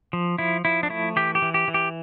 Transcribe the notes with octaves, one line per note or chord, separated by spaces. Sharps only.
F3
F3 E4
F3 E4
D4
A3 E4
E3 G4
G4
E3
G4
E3
G4